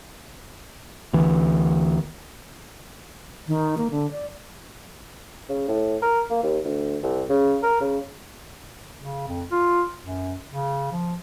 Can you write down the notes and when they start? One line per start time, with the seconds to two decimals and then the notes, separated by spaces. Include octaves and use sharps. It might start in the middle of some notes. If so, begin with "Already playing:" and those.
1.13 D2 E3
3.48 D#3
3.78 A#3
3.91 D3
4.11 D5
5.49 C#3
5.69 A2
6.02 A#4
6.31 A#3
6.43 D#2
6.65 D2
7.03 C2
7.29 C#3
7.63 A#4
7.81 C#3
8.99 C#3
9.28 F2
9.52 F4
10.01 F#2
10.50 C#3
10.92 F3